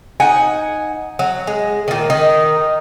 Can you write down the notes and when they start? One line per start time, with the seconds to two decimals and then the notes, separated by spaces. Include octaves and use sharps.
0.20 D#4 F#5 G#5
1.19 F#3
1.47 G#3
1.88 A#2 D#3
2.10 D#3 D#4